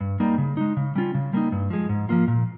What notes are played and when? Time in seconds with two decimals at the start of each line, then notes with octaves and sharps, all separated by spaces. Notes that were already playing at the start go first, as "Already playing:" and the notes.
0.01 G2
0.20 G3 A#3 D#4
0.38 C#3
0.57 G#3 D#4
0.77 C#3
0.96 G3 C#4 F4
1.14 C#3
1.33 G3 A#3 D#4
1.52 G2
1.70 F3 G#3
1.89 G#2
2.09 F3 A#3 F4
2.28 A#2